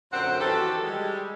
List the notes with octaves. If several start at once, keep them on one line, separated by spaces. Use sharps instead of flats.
F#2 A#2 D3 C4 C5 F#5
D#3 E3 F#4 G4 A4
G3 G#3